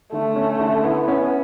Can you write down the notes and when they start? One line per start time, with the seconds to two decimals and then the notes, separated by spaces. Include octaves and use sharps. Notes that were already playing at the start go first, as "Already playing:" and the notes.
0.12 D3 A3
0.36 C#4
0.60 D3
0.84 B3 E4
1.08 C#4